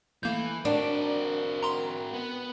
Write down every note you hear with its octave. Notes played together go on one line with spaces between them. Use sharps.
E3 A3 A#3 G6
C4 D4 F#4 A#4
A#5 C6
B3